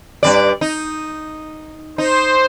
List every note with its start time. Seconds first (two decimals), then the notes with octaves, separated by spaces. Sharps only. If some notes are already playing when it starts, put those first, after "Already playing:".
0.23 G2 C#3 D5
0.61 D#4
1.98 D#4 C5